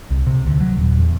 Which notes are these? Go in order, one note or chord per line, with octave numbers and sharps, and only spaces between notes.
C2
C3
D2
F#3
D#1
E2